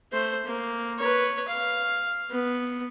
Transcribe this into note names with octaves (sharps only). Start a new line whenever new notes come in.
A3 C5
A#3
B4 C#5
F5
B3